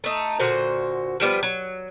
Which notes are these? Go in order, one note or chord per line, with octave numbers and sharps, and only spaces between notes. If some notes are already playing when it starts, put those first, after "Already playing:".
A3 D#4
A#2 D3 F#4 C5
F3 G3 A#3 B3
F#3